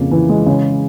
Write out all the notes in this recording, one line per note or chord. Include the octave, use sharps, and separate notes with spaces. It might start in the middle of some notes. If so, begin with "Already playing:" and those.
Already playing: F2 C#3 A#3
E3
G#3
C#3